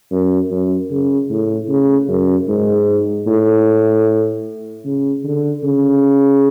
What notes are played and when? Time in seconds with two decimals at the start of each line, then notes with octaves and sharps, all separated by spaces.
0.11 F#2
0.50 F#2
0.90 C#3
1.30 A2
1.69 C#3
2.08 F#2
2.48 G#2
3.27 A2
4.85 C#3
5.24 D3
5.64 C#3